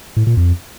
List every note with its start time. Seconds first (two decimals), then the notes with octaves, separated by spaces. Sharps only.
0.17 A2
0.27 A#2
0.37 F2